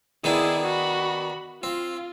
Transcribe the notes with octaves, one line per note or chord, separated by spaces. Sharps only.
D#3 B3 D4 E4 G#4
F#4 B5
C4 F4